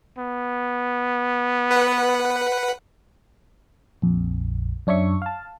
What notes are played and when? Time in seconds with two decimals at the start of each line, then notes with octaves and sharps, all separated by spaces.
0.18 B3
1.71 B4 F#5
4.02 A#1 F2
4.87 F#2 D4 C#5 E5 C#6
5.22 F5 A5